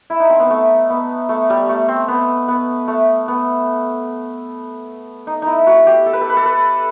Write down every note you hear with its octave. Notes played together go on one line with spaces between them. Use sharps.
E4
D#4
C4
B3
A3
B3
A3
G3
A3
C4
B3
B3
A3
B3
D#4
D#4 E4
F#4
G4
A4
B4
A4
B4
A4
B4